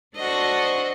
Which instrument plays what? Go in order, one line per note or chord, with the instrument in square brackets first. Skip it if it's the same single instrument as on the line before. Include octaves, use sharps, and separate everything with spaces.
[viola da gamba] D4 A4 C5 [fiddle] F#4 D#5